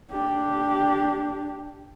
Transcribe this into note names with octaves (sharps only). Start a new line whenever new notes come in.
D4 G4